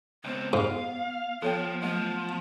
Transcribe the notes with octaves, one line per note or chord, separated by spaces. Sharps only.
C#2 B3 C4
G#2 F5
F3 B3 A4 C#5 G5
F3 F#3 A3 B3